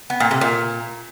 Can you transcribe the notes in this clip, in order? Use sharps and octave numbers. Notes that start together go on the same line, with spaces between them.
B3
A#2
C3
A#2